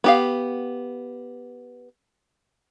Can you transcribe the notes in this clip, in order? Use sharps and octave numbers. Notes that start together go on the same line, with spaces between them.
B3 G4 F5